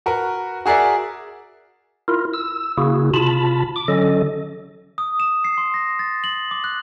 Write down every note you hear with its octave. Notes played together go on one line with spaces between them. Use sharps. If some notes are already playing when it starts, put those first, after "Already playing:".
F#4 A#4 B4
F#4 G#4 A#4 D5 E5
E4 F4 A#4
E6
C#3 A#3 E4 F#4 G#4
C3 F4 A5 B5
D6
D3 F#3 C#4 A4 D#5
D#6
E7
C7
C6
A#6
A6
F#7
D6
F#6